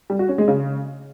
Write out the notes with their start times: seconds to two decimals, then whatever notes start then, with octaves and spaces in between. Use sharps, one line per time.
0.10 G3
0.19 F#4
0.29 C#4
0.38 G#3
0.48 C#3